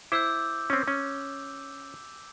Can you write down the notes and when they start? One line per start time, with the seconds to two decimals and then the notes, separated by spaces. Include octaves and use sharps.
0.12 E4 C5 D6 E6 G6
0.70 C4 C#4
0.88 C#4